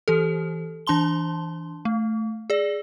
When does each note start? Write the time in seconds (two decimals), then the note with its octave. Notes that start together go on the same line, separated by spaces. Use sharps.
0.08 E3 G4 A4
0.87 E3 D4 A5 C6 G7
1.85 A3
2.50 G#4 D5